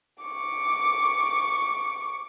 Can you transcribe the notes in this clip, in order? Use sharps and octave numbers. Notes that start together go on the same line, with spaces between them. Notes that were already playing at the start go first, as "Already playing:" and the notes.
C#6 D6